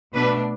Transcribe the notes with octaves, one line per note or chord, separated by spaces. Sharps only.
B2 A3 D4 B4